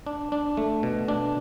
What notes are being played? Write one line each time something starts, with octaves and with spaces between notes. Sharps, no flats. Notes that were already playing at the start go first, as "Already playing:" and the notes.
D4
D4
A3
B2
D4